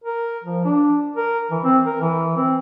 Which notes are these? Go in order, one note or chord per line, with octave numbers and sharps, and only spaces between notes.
A#4
F3
D4
A#4
E3
C4
A#4
E3
C4